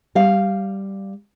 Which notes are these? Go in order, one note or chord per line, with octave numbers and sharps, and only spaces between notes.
G3 F5